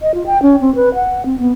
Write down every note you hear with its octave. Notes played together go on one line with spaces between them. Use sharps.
D#5
F4
G5
C#4
C4
B4
F#5
C4
B3